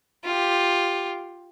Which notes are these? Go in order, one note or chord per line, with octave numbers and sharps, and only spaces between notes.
F4 G4